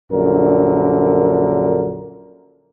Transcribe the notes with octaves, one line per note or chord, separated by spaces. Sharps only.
A#1 F#2 D3 A#4